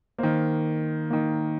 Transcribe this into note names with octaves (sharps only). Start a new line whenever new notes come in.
D#3 A#3 C5
D#3 A#3